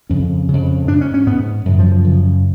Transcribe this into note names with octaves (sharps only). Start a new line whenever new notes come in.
F2 C#3 C#4
F2 C#3
G#2 D4
C#4
C#4
G#2 B3
F#2 C#3
F3
F3
F#2 C#3